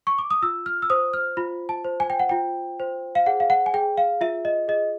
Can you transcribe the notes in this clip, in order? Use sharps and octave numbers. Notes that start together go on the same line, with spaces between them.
C#6
D6
D#6
F4 E6
F6
E6
C5 D#6
F6
F4 B5
A5
C5
G#5
G5
F#5
F4 G5
C5
F5
G#4 F#5
F5
F#5
G#5
G#4 G5
F5
F4 E5
D#5
G#4 D#5